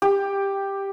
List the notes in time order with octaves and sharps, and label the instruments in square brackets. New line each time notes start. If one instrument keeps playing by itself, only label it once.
[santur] G4